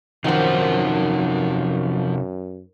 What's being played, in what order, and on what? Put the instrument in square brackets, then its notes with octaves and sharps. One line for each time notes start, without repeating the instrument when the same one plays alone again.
[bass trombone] F#2 [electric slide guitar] C3 D#4 F#5 [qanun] D#3 C5 [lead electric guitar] F3